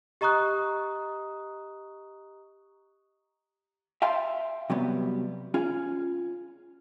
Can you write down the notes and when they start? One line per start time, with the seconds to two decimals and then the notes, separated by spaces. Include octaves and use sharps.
0.21 G4 D#5 A#5 C#6 D#6 F#6
4.02 E5 F5 G5 A5 C6
4.70 C3 F#3 G3 B3
5.54 C#4 F4 G#4